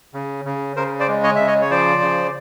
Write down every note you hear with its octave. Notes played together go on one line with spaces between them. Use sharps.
C#3
C#3
C#3 A#4 C5
C5 D5
G#3
C#5 D#5
C#3 E5
C#5 D#5
C#5
F3 C5 D5
C#3